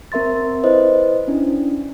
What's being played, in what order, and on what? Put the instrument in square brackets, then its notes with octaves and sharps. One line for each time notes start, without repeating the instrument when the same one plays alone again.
[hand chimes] C4 A#4 E5 C6 A6
E4 B4 C5 D#5
C#4 D4 E4